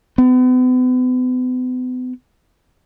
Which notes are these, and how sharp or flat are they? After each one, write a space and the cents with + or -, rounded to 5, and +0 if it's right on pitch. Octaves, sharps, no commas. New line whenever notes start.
B3 +40